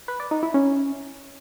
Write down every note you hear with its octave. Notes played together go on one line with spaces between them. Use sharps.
B4
D5
D#4
E4
C#4